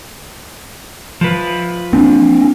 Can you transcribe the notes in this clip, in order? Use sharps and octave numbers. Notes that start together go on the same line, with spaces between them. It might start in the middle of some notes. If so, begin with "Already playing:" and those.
F3 B4
C4 D4